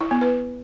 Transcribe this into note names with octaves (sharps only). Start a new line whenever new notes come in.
E4
B3
B4